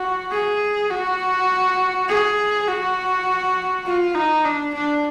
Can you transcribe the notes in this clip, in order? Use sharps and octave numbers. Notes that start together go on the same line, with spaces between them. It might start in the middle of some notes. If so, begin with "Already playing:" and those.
Already playing: F#4
G#4
F#4
G#4
F#4
F4
D#4
D4
D4